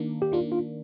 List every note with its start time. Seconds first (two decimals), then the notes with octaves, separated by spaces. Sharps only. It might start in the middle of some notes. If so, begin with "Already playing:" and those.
Already playing: D#3 A#3 D4
0.22 G4
0.32 D#3 A#3 D4 F4
0.52 F4